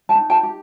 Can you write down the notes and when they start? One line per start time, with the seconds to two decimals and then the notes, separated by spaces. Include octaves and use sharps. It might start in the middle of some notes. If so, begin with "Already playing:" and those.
0.09 G5 A5
0.15 D#4
0.30 G5 A5
0.43 G4